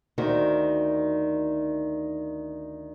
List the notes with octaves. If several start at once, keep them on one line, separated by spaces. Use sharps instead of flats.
D2 D#3 C4 F#4